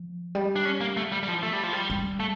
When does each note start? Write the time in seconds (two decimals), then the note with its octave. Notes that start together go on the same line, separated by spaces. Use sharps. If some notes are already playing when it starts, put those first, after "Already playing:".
Already playing: F3
0.35 G3
0.56 D4
0.65 C#4
0.81 A#3
0.97 A3
1.12 G3
1.23 G3
1.28 F3
1.43 A3
1.53 G3
1.63 F3
1.73 G3
1.90 G3
2.20 A3